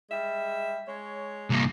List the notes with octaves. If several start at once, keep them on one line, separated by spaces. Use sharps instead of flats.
G3 G#3 E5
G#3 C#5
C2 A#3